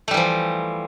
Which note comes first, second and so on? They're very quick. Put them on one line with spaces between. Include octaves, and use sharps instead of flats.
A3 G3 E3 F3